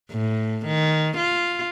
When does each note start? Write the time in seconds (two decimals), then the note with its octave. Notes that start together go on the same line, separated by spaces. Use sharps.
0.12 A2
0.66 D#3
1.17 F4